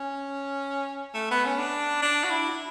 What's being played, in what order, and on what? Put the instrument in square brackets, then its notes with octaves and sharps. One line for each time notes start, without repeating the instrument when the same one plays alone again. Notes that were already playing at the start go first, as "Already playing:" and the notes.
Already playing: [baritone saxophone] C#4
A3
B3
C#4
D4
D4
F#4
E4